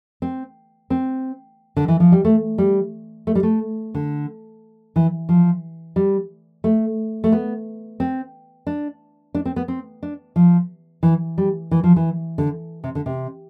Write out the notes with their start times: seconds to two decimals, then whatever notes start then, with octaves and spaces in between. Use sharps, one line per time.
0.22 C4
0.90 C4
1.76 D3
1.88 E3
2.00 F3
2.12 G3
2.25 A3
2.58 G3
3.27 A3
3.35 G3
3.43 A3
3.95 D3
4.96 E3
5.29 F3
5.96 G3
6.64 A3
7.24 A3
7.32 B3
8.00 C4
8.67 D4
9.34 D4
9.45 C4
9.56 B3
9.68 C4
10.03 D4
10.36 F3
11.03 E3
11.38 G3
11.71 E3
11.84 F3
11.96 E3
12.38 D3
12.84 C3
12.95 D3
13.06 C3